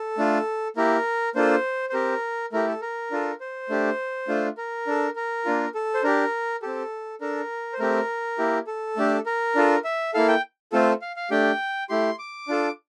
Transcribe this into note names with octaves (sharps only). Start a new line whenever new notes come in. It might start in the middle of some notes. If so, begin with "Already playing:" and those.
Already playing: A4
A3 D4 F4
A#3 E4 G4 A#4
A#3 D4 F4 A4 C5
C5
C4 G4 A#4
A3 E4 G4 A#4
A4
A#4
D4 F4 A4
C5
A3 D4 G4
A3 D4 F4
A#4
D4 A4
A#4
A#3 D4 F4
A4
C5
D4 G4 A#4
C4 G4 A4
D4 A4 A#4
C5
A3 C4 G4 A#4
A#3 E4 G4
A4
A3 D4 G4
A#4
D4 F4 A4
E5
A#3 E4 A4 F5
G5
A3 C4 F4 A4
F5
F5
A3 D4 G4 G5
A3 E4 G4 C6
D6
D4 F4 A4